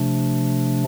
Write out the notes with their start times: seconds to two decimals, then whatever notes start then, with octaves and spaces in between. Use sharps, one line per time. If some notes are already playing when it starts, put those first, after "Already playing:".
Already playing: C3 F3 A3 D4